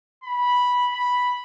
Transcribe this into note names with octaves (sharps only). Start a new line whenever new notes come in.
B5
B5